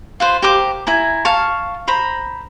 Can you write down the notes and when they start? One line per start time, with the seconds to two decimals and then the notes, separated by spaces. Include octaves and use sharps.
0.20 F4 B4 C5
0.42 G4 A#4 C5 D6
0.87 E4 G#5 A#5
1.25 F5 A5 C#6
1.87 C5 A#5 B5